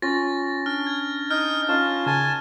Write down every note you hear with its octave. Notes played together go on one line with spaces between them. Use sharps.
C#4 F4 A6 A#6
D4 F6
G#6
D#4 F6 G6
C#4 D#4 F4 A5
C#3 G#5 A5 C6